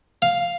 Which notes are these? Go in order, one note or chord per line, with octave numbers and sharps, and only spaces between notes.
F5